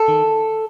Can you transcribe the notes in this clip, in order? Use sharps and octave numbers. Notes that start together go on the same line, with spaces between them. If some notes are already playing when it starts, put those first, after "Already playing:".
Already playing: A4
D#3